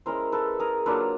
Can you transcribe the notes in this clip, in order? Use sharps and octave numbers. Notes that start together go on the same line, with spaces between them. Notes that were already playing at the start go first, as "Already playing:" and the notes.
G#3 C#4 E4 A#4 C5
A4 B4
G#4 A#4
F#3 A#3 D4 F4 A4 B4